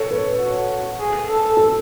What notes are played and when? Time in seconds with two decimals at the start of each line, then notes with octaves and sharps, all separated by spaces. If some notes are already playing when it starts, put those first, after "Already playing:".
Already playing: A4 C#5
0.11 B4
0.40 F#4
0.99 G#4
1.28 A4
1.57 A4